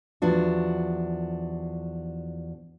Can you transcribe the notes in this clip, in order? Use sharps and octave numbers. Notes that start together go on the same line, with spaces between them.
E2 F3 D4 F#4